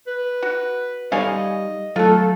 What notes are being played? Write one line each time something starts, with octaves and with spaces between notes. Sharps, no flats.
B4
F#4
G3 D#4 A4 C#5 D#5 F5 G#5
F#3 A3 F4 A4